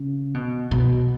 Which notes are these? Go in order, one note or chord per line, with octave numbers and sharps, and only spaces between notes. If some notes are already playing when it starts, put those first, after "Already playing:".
Already playing: C#3
B2
B2